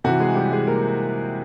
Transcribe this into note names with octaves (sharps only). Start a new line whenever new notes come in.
C3 E3 F#4
G#3 G#4
G3 G4
G#3 G#4
A#3 A#4